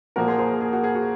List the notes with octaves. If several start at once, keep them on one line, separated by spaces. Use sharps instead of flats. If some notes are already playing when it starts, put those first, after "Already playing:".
A#2 F3 A#3 F#4 A#4
G#4 C5
G#4 C5
G#4
F#4
G#4
F#4